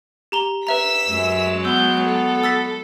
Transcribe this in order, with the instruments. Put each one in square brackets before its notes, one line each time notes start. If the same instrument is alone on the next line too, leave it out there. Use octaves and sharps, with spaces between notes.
[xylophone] G4 A#5 G7
[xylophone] B4 E5 A#5 [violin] E6 B6
[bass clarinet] F#2 [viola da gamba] F#3 G#3 C#5
[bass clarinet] B3 [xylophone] E6 [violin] G6
[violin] A4
[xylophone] E6 A6 B6